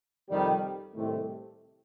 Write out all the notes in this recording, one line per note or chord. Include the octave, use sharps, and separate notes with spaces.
F2 C3 D#3 G3
C2 A2 C3 D#3 A3